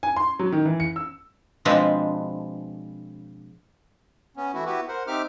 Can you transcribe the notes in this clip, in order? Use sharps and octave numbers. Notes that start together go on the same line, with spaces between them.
G#5
C6
F#3
D#3
E3
C#7
E6
B2 F3 G#3 C4 D4 B4
B3 C#4
E3 A3 E4 F#4
B3 E4 F#4 G4 B4
A#4 C5 F#5
C4 D#4 G4 E5 D6 F6